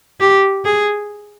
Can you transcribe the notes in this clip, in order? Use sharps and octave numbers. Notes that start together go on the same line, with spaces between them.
G4
G#4